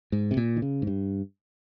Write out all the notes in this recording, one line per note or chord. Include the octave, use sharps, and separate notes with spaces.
G#2
C3
A#2
D#3
C#3
G#2
G2